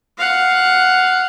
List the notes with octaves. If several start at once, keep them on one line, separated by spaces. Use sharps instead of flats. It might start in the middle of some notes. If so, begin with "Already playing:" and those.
F5 F#5